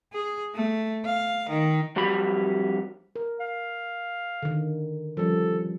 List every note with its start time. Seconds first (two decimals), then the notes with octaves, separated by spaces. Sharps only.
0.13 G#4
0.55 A3
1.06 F5
1.50 D#3
1.96 F2 F#3 G3 B5
3.16 A#4
3.40 F5
4.42 D3 D#3
5.17 F3 G3 C#4 A4